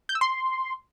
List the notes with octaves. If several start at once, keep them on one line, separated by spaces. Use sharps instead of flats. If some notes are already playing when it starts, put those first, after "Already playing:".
G6
E6
C6